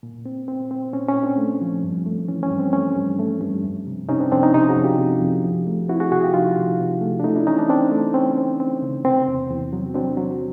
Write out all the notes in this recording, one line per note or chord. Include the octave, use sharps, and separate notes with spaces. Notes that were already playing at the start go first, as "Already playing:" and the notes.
A#2
C4
C4
C4
A#2 C#4
C#4
A#2
C4 D4
A3
F3
G2
A3
E3 C#4
C#4
G2
C4
A3 C#4
G2
A3
G2
F2
C3
C3 C#4 D#4
C4 D4
F2 C4 D4
C#4 D#4
C3 C#4 D#4
F#4 G#4
F2
F4 G4
C3
F2
F3
A3
C4 E4 F#4
F#4 G#4
C3 F#4 G#4
F4 G4
F3 D#4 F4
C3
C3
A3
D4
A3 C#4 D#4
D4 E4
E3 C#4 D#4
C4 D4
C4 D4
A3
C4 C#4
C4
C4
C#3
C3 C4
E2
E2
F#3
F#3 C4 D4
F#3